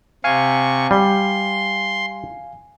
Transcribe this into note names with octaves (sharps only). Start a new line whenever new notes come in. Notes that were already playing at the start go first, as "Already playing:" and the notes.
C3 F5 G#5 C#6
G3 C6